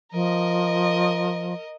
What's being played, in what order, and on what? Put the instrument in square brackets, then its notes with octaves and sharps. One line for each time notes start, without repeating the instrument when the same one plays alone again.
[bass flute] F3 [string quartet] A#4 D#5